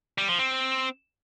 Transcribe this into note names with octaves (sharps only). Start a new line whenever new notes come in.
G3
F3
C4